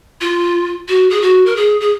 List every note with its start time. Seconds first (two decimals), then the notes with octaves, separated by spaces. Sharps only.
0.21 F4
0.88 F#4
1.10 G#4
1.22 F#4
1.46 A#4
1.56 G#4
1.80 G#4